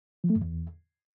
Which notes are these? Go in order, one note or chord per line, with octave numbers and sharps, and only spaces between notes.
F3
A3
F#2
E2